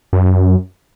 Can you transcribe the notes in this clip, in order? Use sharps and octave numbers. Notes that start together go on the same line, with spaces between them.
F#2